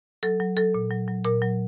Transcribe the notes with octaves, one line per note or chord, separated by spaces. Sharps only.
F#3 A4
F#3
F#3 A4
A#2
F#3
F#3
A#2 A#4
F#3